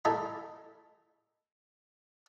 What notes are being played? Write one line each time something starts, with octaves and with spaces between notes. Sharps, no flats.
A3 E4 A4 A#4 D#5 G#5